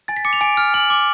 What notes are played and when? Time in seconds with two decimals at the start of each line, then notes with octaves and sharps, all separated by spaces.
0.08 G#5 A6
0.17 B6
0.25 D6 C#7
0.33 F7
0.41 G#5 D7
0.57 F6
0.74 G#5 F#7
0.90 D6